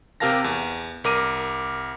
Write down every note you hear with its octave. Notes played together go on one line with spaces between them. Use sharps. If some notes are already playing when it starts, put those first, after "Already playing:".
C3 G4 A#4 F5 A5 A#6
E2
C2 A#4 D6 D#7